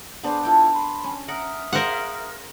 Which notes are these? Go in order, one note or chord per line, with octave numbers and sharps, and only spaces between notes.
B3 D4 G#4 C5
E4 F4 A4 G5
B5 C6
C#4
A#4 E5 F#5 D#6 F6
G#4 A#4 C5 F5 F#5 C6